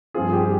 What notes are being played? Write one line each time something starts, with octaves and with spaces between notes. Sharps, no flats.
G2 F3 C4 F4 G#4
G4